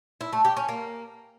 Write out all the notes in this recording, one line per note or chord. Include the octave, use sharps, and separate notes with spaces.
E4
A3
G4
C#4
A#3